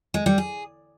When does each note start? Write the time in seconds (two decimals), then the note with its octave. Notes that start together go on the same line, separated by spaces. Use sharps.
0.14 G#3
0.26 G3
0.38 G#4